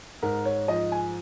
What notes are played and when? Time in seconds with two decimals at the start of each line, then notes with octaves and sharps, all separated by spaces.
0.22 G#2 A#4
0.45 C#5
0.68 F3 D#5
0.92 G#5